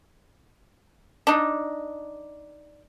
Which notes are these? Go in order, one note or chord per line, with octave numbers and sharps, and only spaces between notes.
D4 D#4